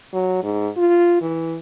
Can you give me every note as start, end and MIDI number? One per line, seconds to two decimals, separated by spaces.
0.13 0.42 54
0.43 0.68 44
0.77 1.20 65
1.21 1.57 52